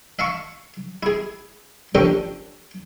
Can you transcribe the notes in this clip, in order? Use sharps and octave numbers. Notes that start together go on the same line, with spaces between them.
E5 F5 A5 C#6
E4 G#4
F3 C#4 D4 G4 A4 A#4